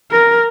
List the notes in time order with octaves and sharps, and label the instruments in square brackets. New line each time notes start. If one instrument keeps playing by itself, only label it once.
[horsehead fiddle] A#4